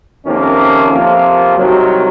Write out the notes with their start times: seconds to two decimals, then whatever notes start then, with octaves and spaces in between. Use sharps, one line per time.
0.25 F2 C3 D#3 A#3 C#4
0.90 F2 C3 F3 A#3 F4
1.57 C2 C3 D#3 F#3